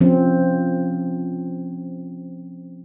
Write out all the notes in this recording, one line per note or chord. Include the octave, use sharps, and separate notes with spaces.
F3 C4 C#4